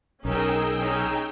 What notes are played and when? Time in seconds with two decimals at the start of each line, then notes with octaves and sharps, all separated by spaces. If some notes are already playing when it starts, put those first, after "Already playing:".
0.25 B1 C#4 D#4 G#4 A#4 G5 E6
0.81 C#4 D#4